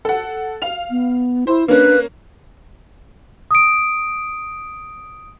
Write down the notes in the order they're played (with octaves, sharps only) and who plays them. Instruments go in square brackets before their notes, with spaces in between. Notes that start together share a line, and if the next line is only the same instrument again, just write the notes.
[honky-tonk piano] A4 F#5
F5 F7
[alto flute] B3
[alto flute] E4 [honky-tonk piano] C5
[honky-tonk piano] A#3 C#4 [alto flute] D4 [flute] B4
[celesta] D#6 D7